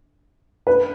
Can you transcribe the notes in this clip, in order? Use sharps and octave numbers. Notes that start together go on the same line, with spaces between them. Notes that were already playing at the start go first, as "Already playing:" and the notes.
B4